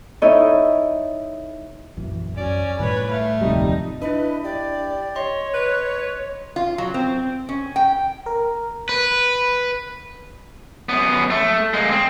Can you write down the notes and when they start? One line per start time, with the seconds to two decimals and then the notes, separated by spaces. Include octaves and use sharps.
0.22 D#4 E4 A4 C#5 D#5
1.97 A#1 F#2 E3
2.37 F#2 C#4 D5
2.80 A2 D#3 G3 B4 C#5
3.11 A3 F5
3.41 D1 F2 C3 G3 D#4
4.01 D4 E4 B4 D#5
4.44 G4 D5
5.15 C#5 D#5 C6
5.54 B4
6.56 F4
6.78 F#3
6.94 C4
7.49 C#4
7.76 G5
8.26 A#4
8.89 B4
10.89 F#2 B3
11.30 A3
11.74 G#3 A#3
11.91 C4